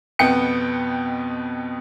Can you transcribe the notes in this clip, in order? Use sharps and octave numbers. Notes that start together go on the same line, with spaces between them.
F2 B2 B3 G5 C#7